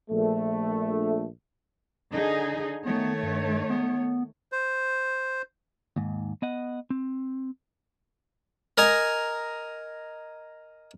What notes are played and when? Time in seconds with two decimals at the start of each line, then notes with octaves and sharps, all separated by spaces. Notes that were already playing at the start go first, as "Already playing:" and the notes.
0.11 A#1 A3
2.11 D3 D#4 G#4
2.85 D#3 A3 B3 C#5
3.23 G2
3.70 B3
4.52 C5
5.96 D#2 G#2
6.42 B3 D#5 F#5
6.90 C4
8.78 A#4 D#5 G#5 A#5